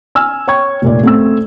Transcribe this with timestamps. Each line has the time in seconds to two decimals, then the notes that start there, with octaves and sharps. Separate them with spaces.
0.15 G#5 E6 F6
0.47 C#5 G5 C#6 G#6
0.82 F1 A#2 D5
1.03 A3 C4 E6